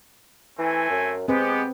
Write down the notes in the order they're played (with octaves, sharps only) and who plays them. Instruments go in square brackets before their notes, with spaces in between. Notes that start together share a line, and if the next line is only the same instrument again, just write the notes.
[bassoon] E3 [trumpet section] A3 C4 G#5
[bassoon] F#2
[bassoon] G#3 [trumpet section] B3 G4 [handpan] C4 B4